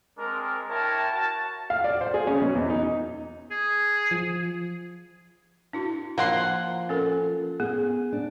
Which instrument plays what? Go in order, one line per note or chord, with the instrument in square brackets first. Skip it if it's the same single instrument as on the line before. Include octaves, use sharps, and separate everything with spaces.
[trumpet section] G#3 C4 D4 A#4
E4 A#4 C#5 G5 A5
F#4 A5
[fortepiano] F5
D5
C5
G#4
C#4
B2
E2
D#4
[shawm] G#4
[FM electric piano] F3
[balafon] D4 E4 F#4
[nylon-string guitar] F3 [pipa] A#3 F#5 C6
[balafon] C#4 A4 A#4
[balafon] B3 [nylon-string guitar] G#4
[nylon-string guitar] D4